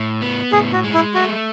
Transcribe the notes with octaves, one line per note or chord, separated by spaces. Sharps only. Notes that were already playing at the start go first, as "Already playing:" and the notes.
Already playing: A2
B3
A2 G#4
F#4
G#3
E4
A3 F#4